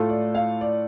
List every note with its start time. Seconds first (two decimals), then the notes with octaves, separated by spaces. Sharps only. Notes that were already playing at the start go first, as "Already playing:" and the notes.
Already playing: A2 A3 F4 A4
0.09 D5
0.35 F5
0.61 D5